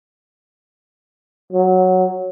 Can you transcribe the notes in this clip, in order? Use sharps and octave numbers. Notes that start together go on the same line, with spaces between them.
F#3